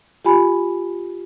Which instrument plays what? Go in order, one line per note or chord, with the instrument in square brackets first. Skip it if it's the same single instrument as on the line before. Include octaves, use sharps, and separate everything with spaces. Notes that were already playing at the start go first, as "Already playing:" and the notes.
[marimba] F4 G4 G#5 B5